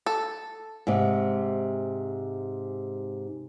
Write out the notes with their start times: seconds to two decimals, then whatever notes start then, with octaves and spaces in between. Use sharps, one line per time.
0.06 A4
0.87 G#2 C3